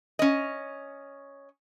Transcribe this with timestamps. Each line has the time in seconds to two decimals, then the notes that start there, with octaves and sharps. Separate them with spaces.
0.19 C#4 D#5